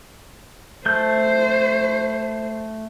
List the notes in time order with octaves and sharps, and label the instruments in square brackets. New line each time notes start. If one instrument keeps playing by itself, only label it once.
[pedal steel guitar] A3 G6 [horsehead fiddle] C5